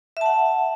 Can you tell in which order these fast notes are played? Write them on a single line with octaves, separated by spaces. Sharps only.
E5 A5 F#5